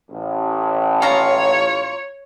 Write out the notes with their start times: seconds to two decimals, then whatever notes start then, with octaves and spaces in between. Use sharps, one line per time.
0.11 A1
1.02 F4 C#5 A#5